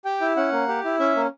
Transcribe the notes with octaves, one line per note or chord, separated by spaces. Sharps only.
G4 G5
E4
C#4 F#5
A#3
G4
E4
C#4 E5
A#3